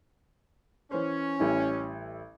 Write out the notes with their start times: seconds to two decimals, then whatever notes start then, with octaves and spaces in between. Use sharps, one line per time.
0.91 E3 C#4 C5
1.40 A1 G3 E4